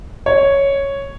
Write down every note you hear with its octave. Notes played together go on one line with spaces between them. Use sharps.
C#5